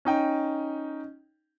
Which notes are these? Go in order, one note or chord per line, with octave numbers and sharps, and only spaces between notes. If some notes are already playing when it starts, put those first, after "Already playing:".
C#4 D#4 G5